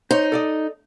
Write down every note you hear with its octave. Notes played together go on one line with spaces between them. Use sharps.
D#4 C5 C#5
A4 D5 D#5